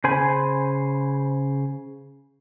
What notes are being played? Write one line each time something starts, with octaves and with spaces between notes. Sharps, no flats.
C#3 C5 G#5 B5